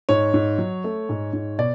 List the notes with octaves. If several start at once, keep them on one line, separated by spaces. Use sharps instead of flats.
G#2 C#5
G#2
F#3
A3
G#2
G#2
B2 D5